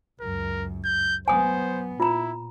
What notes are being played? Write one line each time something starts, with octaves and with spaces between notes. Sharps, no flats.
C#2 F#2 A#4
G6
F#3 B3 C5 G#5 D#6
A#2 E4 F4 A#5